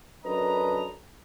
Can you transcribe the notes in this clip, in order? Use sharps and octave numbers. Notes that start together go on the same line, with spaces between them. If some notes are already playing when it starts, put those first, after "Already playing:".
F#2 D4 A4 B4 D#5 A#5